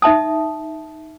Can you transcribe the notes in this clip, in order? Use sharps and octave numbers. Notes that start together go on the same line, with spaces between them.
D#4 E5 A5 D#6